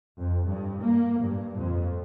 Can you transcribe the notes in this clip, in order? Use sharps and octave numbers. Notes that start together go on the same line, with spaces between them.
F2
G2
A#3
G2
F2